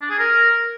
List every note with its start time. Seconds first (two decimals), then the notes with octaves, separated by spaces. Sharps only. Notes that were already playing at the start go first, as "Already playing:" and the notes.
0.01 D4
0.10 G#4
0.19 A#4